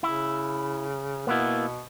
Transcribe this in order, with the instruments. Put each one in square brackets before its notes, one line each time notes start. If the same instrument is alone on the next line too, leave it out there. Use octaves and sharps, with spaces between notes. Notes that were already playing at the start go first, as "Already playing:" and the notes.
[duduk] C#3 [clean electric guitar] E4
[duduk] B2 [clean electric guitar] A#3 B3 E4